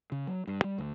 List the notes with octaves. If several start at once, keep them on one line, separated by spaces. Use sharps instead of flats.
C#3
F#3
G2
G3
D2